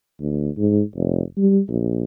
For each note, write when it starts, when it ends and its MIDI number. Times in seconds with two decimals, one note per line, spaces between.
0.20 0.50 38
0.57 0.81 44
0.96 1.22 29
1.38 1.60 55
1.68 2.04 34